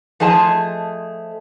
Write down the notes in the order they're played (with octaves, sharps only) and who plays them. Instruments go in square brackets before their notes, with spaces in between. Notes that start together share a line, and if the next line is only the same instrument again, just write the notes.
[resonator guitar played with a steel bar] F3 A3 G#4 D#5 A5